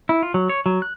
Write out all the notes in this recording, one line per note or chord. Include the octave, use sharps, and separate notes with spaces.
E4
F4
F#3
C#5
F#3
F#6